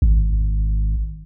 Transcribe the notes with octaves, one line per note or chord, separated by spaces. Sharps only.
G#1